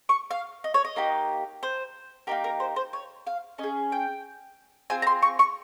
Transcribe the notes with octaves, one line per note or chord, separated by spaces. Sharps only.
C#6
F5
D#5
C#5
D#5
A#3 D#4 G4
C5
A#3 D#4 G4 A#4
A#4
C5
C5
C#5
F5
C#4 D#5
G#4
G5
C4 F4 G#4 G#5
A#5
C6
C#6
C#6